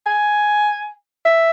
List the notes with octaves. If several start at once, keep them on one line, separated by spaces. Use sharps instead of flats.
G#5
E5